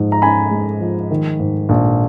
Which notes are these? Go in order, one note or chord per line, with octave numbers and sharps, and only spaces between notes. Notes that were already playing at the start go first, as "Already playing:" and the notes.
Already playing: G#2 F3 G#3
A#5
C#4 G#5 B5
G#3
F3
D#3
G#2
A#1